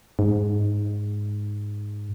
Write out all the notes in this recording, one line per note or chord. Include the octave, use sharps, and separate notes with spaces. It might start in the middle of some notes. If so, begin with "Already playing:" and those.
G#2